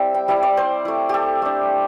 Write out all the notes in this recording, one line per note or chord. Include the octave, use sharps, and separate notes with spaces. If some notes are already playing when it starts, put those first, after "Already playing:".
Already playing: G3 C4 E4 E5
G5
G3 E4 E5
D5
C5
A3 E4
G4 A4
A3 D4